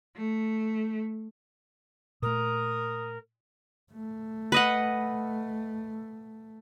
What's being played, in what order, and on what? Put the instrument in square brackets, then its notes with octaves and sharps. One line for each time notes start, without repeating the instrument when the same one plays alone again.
[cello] A3
[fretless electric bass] A#2 A3 [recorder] A#4 [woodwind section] D#6
[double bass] A3
[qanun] B4 D#5 F#5